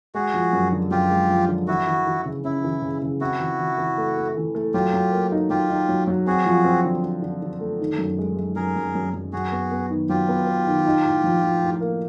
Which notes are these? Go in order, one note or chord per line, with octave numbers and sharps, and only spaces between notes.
G#3 F#4 G#4
F3
F#2
D3
F#2 F4 G4
G#3
F3
D3
E3 E4 F#4
E3
E3
C#3
C#4 E4
E3
C#3
C#3
C4 E4 F#4
E3
E3
E3
A3
A3
E3
A3
F#3 F4 G4
F#3
A#3
D#4
F#3 F4 G4
D#4
F#3
F#3
C4 F#4 G#4
F3
C4
D3
C4
D3
D3
A3
D#3
F#2
G#3
G#3
F#2 G#4 A#4
F#2
F#2
F#2
F#2 F#4 G#4
B3
B3
D#3
F#3 F4 G4
B3
B3
D#3
D#4
A2
F3
F3
A2
A#3